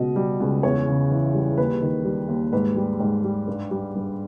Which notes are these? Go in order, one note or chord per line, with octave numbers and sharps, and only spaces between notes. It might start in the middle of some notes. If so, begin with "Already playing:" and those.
Already playing: C#2 B2 D#5
G3
C#2
E2 C#5
C#3
E3
G3
D#2 B4
D#3
G3
D#2
G#2 B4
G3
G#2
G3
G2
G3
G2